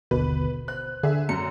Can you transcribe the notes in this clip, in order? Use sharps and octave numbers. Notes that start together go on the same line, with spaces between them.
G#1 D#2 B2 D3 B4
C5 F#6
D3 G#4 E5
F#2 C#7